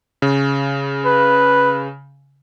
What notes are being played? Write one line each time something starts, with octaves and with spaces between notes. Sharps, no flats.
C#3
B4